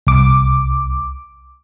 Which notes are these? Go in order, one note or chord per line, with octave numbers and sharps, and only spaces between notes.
C2 D6